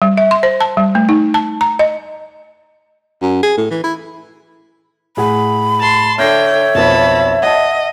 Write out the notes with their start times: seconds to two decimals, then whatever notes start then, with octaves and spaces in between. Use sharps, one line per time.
0.02 G3
0.17 E5
0.31 C6
0.43 C5
0.61 A5
0.77 G3
0.95 A3
1.09 D#4
1.34 A5
1.61 A#5
1.79 D#5
3.22 F#2
3.43 G#4
3.57 A2
3.71 E3
3.84 E4
5.17 A2 G#4 F#5 B5
5.80 A5 C6
6.18 D3 C#5 E5 G5 F6 A#6 C7
6.75 B1 F2 B3 A5 B5
7.42 D#5 F#5 A5